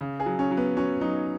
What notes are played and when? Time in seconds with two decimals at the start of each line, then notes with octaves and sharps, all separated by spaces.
0.01 C#3
0.20 G#4
0.26 F#3
0.39 C#4
0.51 F#3
0.57 B3
0.77 F#3 C#4
1.01 F#3 D#4